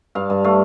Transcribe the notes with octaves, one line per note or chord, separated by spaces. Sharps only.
G2 F5
G2
A3 F5